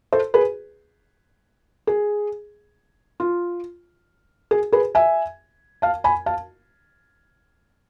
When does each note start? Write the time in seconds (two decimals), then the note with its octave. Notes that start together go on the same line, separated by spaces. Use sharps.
0.13 A4 C5
0.34 G#4 B4
1.87 G#4
3.20 F4
4.51 G#4
4.72 G#4 B4
4.95 E5 G#5
5.82 F5 A5
6.04 G#5 B5
6.26 F5 A5